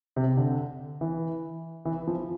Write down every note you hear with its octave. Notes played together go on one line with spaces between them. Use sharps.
C3
D3
E3
E3
F3